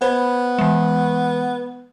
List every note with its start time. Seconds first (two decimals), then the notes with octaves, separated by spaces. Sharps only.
0.02 B3 C5 B5
0.59 E3 G#3